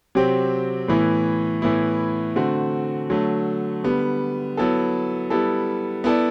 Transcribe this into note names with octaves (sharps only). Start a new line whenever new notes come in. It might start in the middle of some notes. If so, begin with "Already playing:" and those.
C3 F#3 C4 G4
A2 E3 B3 E4
A2 E3 B3 E4
D3 A3 C4 F#4
D3 F#3 A3
D3 G3 B3
F#3 B3 E4 A4
G3 B3 E4 A4
B3 E4 A4 D5